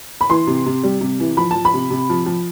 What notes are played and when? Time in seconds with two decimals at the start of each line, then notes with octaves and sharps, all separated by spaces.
0.21 B5
0.30 E3 C6
0.47 C3
0.66 C3
0.84 G3
1.01 C3
1.20 E3
1.37 F3 B5
1.51 F3 A5
1.65 B5
1.74 C3
1.90 C3
2.10 F3
2.26 F3